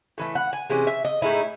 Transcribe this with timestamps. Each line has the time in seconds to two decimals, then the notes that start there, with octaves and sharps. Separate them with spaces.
0.18 A2 E3 A3
0.35 F#5
0.53 G#5
0.70 C3 E3 G#3 C#4
0.87 E5
1.05 D#5
1.22 A2 G#3 D#4 E4